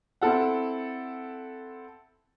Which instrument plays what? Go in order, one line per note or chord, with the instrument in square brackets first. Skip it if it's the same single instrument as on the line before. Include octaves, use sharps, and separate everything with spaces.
[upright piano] C4 E4 A4 F#5